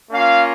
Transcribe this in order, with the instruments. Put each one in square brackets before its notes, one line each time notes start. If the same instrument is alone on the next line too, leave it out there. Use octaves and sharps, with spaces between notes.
[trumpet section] A#3 C#4 F4 F5